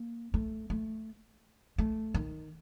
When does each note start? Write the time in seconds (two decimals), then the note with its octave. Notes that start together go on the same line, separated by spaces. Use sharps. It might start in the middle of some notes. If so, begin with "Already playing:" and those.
Already playing: A#3
0.34 A3
0.70 A3
1.78 A3
2.14 D#3